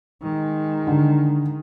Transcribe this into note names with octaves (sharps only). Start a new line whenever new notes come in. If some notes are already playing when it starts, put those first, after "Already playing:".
D#3 G#3
D3